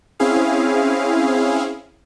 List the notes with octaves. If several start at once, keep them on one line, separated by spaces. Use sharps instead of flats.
C4 C#4 E4 G#4 F5